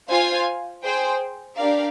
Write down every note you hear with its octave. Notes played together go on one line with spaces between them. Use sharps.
F4 C5 F5 G#5
G#4 C5 G5
D4 G4 A#4 D5 F5